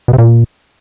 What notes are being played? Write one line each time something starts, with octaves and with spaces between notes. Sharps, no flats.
B2
C3
A#2